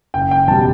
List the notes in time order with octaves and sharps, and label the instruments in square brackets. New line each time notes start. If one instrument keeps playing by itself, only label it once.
[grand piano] F#1 G5
G5
E2 B2 G3 A5